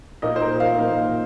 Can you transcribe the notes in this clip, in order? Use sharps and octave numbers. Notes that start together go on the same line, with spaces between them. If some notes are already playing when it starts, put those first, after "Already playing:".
A#2 A#3 D#4 D#5
C5
A#4
F5
A#2 A#3 D#4